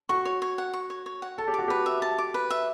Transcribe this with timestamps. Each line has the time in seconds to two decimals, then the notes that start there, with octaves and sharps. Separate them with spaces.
0.09 F#4 C#6
0.25 C#5
0.42 C#5
0.58 F#5
0.73 C#6
0.90 C#5
1.06 C#5
1.22 F#5
1.38 A4 A5
1.47 G4
1.54 F#4 D6
1.68 G4 B4
1.86 E5
2.02 A5
2.18 D6
2.34 B4
2.50 E5